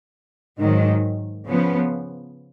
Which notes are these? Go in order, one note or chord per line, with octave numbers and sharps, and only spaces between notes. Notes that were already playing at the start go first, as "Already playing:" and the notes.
G#2 D#3 F#3
C#3 F3 B3